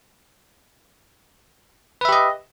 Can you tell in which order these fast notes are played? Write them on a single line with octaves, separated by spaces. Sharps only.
B4 E5 G4 D#5